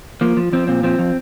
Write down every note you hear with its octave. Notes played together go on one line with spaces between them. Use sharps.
F3 A#3
F3
F3 C4
A#2 C4
F3 C4
F3